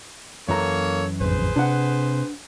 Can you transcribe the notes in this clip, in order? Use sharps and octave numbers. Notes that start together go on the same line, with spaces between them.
F#2 E3 A#3 A4 C#5 A#5
A1 F2 G#4 B4 C5
C3 D4 F#5